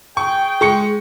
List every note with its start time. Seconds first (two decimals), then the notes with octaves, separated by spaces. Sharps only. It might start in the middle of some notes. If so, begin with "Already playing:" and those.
0.17 G#4 G5 C#6
0.61 G#3 C#6 C#7